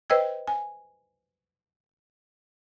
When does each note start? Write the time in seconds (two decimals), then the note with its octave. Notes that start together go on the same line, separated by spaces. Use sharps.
0.10 B4 C5 D#5 G5 E6 G#6
0.48 G#5